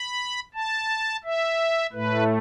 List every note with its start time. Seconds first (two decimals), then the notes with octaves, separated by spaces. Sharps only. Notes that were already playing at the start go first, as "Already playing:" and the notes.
Already playing: B5
0.54 A5
1.24 E5
1.93 A2 A3 B4